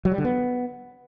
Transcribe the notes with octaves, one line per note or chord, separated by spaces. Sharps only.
F#3
G3
D3
B3